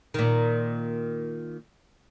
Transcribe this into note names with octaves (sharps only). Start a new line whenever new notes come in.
A#2 D#3